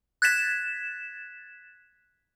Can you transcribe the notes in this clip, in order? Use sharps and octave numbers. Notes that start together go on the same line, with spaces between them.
F#6 G#6 A6 B6 E7